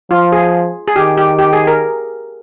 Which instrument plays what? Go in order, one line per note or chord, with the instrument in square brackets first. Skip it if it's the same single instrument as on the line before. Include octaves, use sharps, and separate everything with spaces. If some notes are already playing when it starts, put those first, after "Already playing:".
[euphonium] F3 [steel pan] F4
[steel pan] G#4
G#4
[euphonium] D#3 [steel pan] G4
[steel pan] G4
G4
G#4
A#4